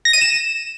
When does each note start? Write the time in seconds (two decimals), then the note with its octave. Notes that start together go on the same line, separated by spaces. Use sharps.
0.05 A#6
0.13 D#7
0.21 E7